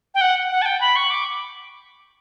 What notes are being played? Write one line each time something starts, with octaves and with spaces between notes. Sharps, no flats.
G5
F#5
F#5
A5
G5
B5
C#6
D6